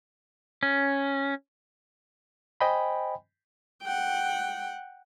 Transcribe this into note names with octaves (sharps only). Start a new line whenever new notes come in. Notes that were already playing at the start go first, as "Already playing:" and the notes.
C#4
C5 D#5 G5 G#5 B5
F#5 G5